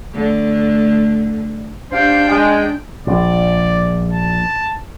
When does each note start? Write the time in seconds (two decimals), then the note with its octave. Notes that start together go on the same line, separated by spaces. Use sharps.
0.14 D3 A3
1.92 D4 G4 C5 F5 G5
2.29 G#3
3.07 A#1 D5
4.12 A5